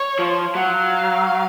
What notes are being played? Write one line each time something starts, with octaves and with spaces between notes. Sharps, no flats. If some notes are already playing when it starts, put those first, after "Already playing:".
Already playing: C#5
F3
F#3 F5